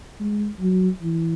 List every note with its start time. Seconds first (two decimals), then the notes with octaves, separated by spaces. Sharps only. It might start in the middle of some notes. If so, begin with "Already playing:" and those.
0.20 G#3
0.60 F#3
1.02 E3